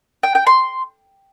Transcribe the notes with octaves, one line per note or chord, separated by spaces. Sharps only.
G5
G5
C6